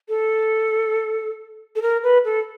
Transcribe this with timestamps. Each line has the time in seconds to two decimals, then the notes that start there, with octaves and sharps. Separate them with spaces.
0.09 A4
1.76 A4
1.82 A#4
2.03 B4
2.25 A4